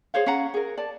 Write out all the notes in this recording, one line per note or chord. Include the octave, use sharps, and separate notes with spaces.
G#4 C5 C#5 F5
C#4 F5 F#5 A#5
G#4 A#4
D5 A5